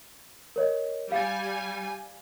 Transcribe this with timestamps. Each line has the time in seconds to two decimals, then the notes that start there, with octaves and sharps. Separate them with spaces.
0.56 A#4 C#5 D#5
1.12 G3 F5 G#5 A6